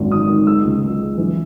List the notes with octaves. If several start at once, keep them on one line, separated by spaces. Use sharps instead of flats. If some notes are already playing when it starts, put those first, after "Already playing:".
Already playing: G#1 F#2
D#3 D#6
D#3
G#3 E6
C#2
G#3
C#3
E3